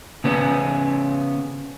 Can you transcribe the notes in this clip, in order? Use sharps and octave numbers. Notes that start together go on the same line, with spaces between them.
C#3 B3 C#4